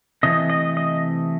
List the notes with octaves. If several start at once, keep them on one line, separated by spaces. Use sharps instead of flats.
C3 E3 A3 D#5
D#5
D#5